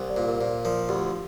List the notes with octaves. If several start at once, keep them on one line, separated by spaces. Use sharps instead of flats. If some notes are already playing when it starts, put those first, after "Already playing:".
Already playing: C2 C5
D5
A#2 C5
A#4
A#2 C5
F3 A#4
D2 G4